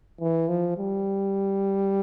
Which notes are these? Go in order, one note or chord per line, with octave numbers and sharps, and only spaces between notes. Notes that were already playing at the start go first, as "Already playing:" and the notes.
E3
F3
G3